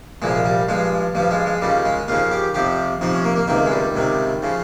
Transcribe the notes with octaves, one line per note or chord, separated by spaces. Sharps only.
C2 A#2 F3 G#3
G3
G2 F3 G#3
G2 F3 G3
G#3
G#3
D#2 C#3 F3 G3
G#3
D#2 C#3 F3 F4
G4
F2 C3 F3 G4
F2 C3 F3 D#4
C#4
A#3
A#3
C#2 C3 D#3 A#3
G#3
G3
C#2 C3 D#3
C#3 F3